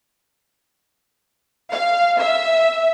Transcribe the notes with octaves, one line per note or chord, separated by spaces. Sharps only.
F5
E5